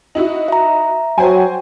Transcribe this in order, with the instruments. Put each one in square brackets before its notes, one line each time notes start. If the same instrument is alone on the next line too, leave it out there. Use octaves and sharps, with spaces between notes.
[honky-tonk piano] D#4 E4 F#4
[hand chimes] E5 A#5
[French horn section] F#3 [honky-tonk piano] C5 G5 G#5